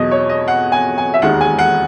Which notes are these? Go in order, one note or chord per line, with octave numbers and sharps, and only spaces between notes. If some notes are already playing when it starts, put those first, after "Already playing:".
Already playing: E2 B2 F#3 D#5
C#5
D#5
F#5
G#5
G#5
E5
E1 D#2 D#3 G#3 F#5
G#5
F#5